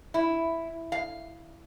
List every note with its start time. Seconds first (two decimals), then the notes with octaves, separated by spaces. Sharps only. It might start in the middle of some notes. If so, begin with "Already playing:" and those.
0.14 E4
0.92 F5